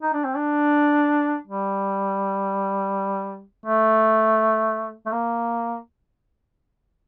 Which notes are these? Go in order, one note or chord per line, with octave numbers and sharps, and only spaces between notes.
D#4
D4
C4
D4
G3
A3
A3
A#3